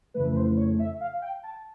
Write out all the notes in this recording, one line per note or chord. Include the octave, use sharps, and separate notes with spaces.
F2 C#3 E3 A3 B4
B4
C5
C#5
E5
F5
G5
A5